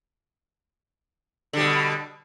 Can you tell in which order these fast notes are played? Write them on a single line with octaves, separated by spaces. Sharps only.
D3 G3 B2